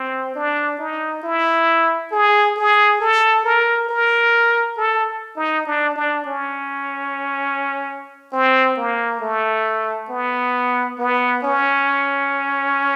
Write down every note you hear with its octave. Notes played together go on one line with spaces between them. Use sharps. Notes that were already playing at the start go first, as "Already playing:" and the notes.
Already playing: C4
D4
D#4
E4
G#4
G#4
A4
A#4
A#4
A4
D#4
D4
D4
C#4
C4
A#3
A3
B3
B3
C#4